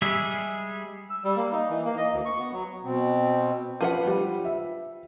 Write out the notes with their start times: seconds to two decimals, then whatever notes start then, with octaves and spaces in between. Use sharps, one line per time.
0.02 G3 G#3 G#4 E5
1.10 E6
1.24 G3
1.37 A#3
1.52 D#4
1.70 E3
1.85 A#3
1.97 D#5
2.12 D2
2.26 C#6
2.38 B3
2.53 F#3
2.83 B2 C4
3.81 F3 B4 F#5 D#7
4.07 G3
4.45 E5